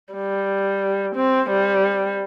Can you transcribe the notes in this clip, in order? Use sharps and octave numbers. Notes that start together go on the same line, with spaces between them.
G3
C4
G3